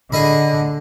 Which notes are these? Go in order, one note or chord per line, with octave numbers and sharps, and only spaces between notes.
D3 G#4 D#5 B5